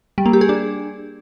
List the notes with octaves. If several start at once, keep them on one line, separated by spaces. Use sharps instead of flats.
G3
A#3
G4
G#4
D4